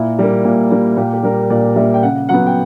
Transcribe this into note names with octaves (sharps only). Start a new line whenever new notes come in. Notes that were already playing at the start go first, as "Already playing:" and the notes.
Already playing: A#2 E4
G3 A#3
A#2
G3 A#3
A#2 G4
G4
G3 A#3 A#4
A#2 D5
G3 A#3 E5
G5
C#3 F#5
F#3 B3 F#5
G5